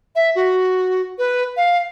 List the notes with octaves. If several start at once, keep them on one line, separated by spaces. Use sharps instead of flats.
E5
F#4
B4
F5